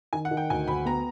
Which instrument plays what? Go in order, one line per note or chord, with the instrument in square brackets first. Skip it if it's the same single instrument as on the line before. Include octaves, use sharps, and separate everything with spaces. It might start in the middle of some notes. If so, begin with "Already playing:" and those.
[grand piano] D#3 [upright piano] G#5
[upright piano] F#5
[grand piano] D#3
[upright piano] G5
[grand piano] D2 [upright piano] G#5
[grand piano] D2 [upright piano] B5
[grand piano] B3 [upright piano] A#5